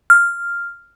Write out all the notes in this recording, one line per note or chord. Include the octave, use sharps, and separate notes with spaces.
F6